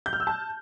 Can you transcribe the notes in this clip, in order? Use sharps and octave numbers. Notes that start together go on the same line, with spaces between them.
G6
F6
E6
A5